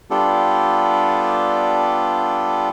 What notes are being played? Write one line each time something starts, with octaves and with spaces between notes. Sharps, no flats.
G3 B3 D4 F4 G4 A4